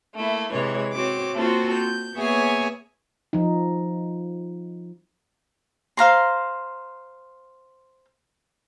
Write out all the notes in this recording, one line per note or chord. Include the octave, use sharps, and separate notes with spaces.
A3 A#3 E4
C3 E3 G#3 C#5
C4 F#4 C#5 D6
A#3 C4 F4 F#4 A4 C5
G6
A#3 B3 G#4 C#5 E5 G#5
F3 D#4
C5 F5 A#5 C6